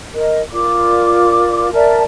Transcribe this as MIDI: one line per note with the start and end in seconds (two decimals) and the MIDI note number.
0.14 0.41 70
0.14 0.41 75
0.51 1.69 65
0.51 1.69 70
0.51 1.69 74
0.51 1.69 86
1.73 2.03 70
1.73 2.03 74
1.73 2.03 76
1.73 2.03 81